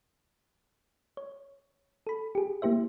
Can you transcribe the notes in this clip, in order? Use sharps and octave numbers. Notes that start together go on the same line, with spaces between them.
C#5
A4 B5
G4 G#4
A#3 E4 G4 C5 E5